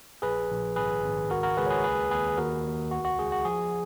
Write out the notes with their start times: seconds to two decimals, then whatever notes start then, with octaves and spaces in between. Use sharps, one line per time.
0.22 A#1 G#4 B4
0.50 A#1
0.76 G#1 G#4 B4
1.03 G#1
1.30 C#2 F#4 A#4
1.43 F#4 A#4
1.57 C#2 G#4 B4
1.66 C#5
1.70 G#4 B4
1.84 D#2 G#4 B4
2.11 D#2 G#4 B4
2.38 D#2 F#4 A#4
2.65 D#2
2.91 C#2 F#4
3.05 F#4
3.18 C#2 G#4
3.32 F#4
3.45 F3 G#4